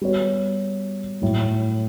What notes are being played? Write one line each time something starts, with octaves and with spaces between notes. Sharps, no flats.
G3 B3 F#4 C#5
A2 F#3 A3